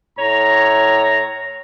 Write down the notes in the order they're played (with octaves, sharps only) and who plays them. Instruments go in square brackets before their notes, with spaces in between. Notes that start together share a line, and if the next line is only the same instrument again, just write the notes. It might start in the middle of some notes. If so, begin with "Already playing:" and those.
[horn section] A2 C#5 A#5